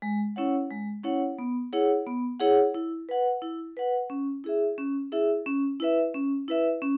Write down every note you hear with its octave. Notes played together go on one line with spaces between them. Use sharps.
G#3
C#4 E4 C#5 F#5
G#3
C#4 E4 C#5 F#5
B3
E4 G#4 C#5 F#5
B3
E4 G#4 C#5 F#5
E4
B4 F#5
E4
B4 F#5
C#4
E4 G#4 E5
C#4
E4 G#4 E5
C#4
E4 B4 E5
C#4
E4 B4 E5
C#4